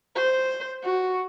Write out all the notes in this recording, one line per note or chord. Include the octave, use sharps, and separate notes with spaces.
C5
F#4